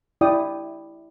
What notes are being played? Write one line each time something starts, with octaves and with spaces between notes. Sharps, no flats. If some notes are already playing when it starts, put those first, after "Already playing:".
E4 D5 G5 D#6